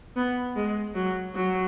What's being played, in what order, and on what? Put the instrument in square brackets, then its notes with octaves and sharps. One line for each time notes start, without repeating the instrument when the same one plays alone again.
[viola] B3
G#3
F#3
F#3